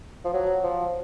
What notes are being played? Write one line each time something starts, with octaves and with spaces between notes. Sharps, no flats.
F3
F#3
F3